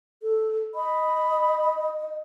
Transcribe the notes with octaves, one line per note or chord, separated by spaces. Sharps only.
A4
D#5 B5